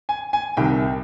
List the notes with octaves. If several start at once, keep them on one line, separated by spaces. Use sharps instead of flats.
G#5
G#5
C2 C3 D#3 G5